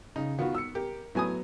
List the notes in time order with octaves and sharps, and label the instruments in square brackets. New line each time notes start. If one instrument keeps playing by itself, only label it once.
[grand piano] C#3 [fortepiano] D#4
[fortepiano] D#3 B3 [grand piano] F4 F#4
[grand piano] E6 C#7
[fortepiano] G4 [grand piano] A#4
[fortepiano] A2 G#5 D#6 [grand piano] F#3 B3